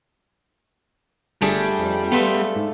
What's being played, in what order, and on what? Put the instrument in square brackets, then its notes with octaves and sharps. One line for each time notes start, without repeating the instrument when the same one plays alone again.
[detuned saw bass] G1 [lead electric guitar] G3 [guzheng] A3 D4 G#4
[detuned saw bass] F2
[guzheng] A3 F4 E5 [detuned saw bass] B3
[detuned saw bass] G#2